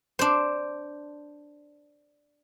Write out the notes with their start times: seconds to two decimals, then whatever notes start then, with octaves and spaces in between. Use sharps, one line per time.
0.19 D4 C5